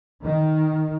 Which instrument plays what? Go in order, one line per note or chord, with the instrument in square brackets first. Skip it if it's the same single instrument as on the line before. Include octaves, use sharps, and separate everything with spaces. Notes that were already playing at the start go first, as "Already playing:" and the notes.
[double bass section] D#3